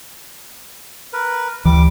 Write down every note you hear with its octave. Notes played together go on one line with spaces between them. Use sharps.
A#4 B4
D2 E3 G3 D6